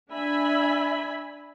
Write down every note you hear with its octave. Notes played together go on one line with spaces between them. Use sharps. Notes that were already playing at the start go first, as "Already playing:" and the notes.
D4 E5 G#5 B5